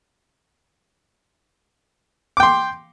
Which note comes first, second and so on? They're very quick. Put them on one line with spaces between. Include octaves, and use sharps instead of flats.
D6 G5 C6